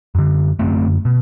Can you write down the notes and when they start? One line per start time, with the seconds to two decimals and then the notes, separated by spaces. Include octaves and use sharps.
0.15 F#2 D3
0.59 F#2 D3 A3 C4
1.05 B2